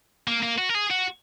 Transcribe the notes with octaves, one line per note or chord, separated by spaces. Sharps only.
A#3
A#3
F#4
A#4
G#4
F#4